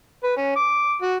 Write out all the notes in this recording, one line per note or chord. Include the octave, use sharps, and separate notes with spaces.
B4
C#4
D6
F#4